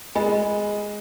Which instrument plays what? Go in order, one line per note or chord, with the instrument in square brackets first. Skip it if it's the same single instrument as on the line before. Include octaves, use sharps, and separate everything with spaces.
[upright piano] G#3 [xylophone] D#5 G#5 B5